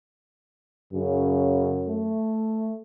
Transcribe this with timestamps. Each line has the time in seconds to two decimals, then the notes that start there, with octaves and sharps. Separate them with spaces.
0.93 F#2 C#3
1.88 A3